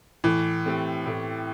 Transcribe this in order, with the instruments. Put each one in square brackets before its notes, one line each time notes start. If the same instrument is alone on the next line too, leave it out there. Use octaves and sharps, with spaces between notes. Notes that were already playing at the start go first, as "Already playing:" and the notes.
[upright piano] A2 [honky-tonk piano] E3
[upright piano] A3 C4 G4
A2